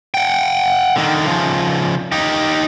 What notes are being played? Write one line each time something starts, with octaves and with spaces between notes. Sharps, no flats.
F#5 G5
D3 D#3
C#3 F3
D#4 G4